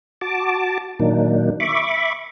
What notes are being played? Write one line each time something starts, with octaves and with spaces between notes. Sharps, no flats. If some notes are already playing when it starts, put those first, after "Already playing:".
F#4 A5 D6
A#2 D#3 F#3 A#3 D4 D#4
E5 B5 C#6 D6